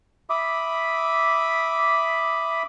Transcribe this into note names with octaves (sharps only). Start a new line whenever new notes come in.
E5 B5 D6 D#6